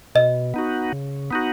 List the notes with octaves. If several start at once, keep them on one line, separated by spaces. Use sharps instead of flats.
B2 D#5
B3 D#4 F#4
C#3
B3 D#4 F#4